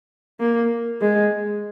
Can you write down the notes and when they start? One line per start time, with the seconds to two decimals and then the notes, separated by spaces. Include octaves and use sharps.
0.40 A#3
1.01 G#3